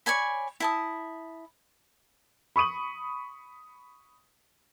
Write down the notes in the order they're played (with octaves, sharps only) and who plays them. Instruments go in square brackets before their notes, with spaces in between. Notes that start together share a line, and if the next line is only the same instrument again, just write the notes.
[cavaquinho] C#5 D5 G#5 B5
E4 A5 D#6
[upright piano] B5 C#6 D#6 D#7 F#7